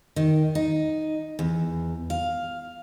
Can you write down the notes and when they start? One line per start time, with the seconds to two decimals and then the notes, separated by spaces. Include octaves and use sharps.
0.16 D#3
0.55 D#4
1.39 E2
2.10 F5